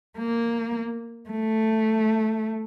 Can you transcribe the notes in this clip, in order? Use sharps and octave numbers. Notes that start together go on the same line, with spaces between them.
A#3
A3